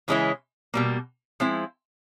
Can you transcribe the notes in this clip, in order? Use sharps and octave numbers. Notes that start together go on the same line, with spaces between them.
C#3 E3 G#3 C#4 E4
B2 G3 A#3
F3 G#3 C4 E4